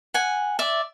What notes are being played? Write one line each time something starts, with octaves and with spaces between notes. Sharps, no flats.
F#5 G#5
D5 E5